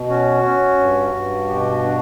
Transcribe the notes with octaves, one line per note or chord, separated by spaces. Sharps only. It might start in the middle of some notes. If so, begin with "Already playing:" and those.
Already playing: B2
C#4 F#4
C#4
G2
G2
B2 G4
F#4
D4